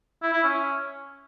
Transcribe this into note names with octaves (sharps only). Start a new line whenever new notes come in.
E4
E4
C#4